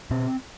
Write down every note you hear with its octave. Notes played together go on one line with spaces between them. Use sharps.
B2 C4